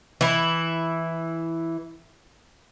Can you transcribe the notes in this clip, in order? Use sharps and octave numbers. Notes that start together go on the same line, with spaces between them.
E3 E4